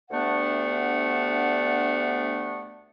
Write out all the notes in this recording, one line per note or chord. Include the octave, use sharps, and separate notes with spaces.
D2 G3 A3 B3 D4 F#5